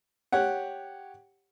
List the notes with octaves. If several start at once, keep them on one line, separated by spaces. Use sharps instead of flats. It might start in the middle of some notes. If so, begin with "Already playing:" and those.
G4 C#5 F#5